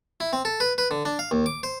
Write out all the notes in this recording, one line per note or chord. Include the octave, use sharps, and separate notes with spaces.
E4
C4
A4
B4
B4
D3
D4
F5
D#2
D6
C5